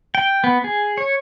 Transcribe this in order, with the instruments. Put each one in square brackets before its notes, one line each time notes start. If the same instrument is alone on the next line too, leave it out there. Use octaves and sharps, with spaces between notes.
[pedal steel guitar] G5
B3
G#4
C#5